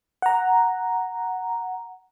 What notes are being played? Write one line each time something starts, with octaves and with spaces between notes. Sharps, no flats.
F#5 A#5